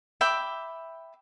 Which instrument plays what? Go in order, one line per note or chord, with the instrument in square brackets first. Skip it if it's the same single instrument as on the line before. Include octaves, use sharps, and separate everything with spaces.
[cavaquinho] E5 G5 B5 D6